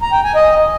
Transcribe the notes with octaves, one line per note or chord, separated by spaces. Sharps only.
A#5
G5
G#5
D#5